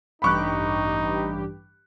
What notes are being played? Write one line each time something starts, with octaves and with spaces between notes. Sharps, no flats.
A1 G2 D#4 G4 B5 C#6 F#6